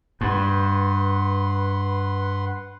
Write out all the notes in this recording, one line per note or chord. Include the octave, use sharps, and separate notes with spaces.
G2 B4 F#5 C6